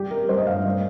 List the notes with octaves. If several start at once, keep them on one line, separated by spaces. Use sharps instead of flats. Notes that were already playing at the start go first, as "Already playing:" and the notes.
Already playing: G3 G4
G3 A#4
G3 C5
D#5
G2 F5
G3